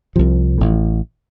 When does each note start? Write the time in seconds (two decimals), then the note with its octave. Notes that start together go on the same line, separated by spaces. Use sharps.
0.16 C2 C3 F3
0.58 A1 A2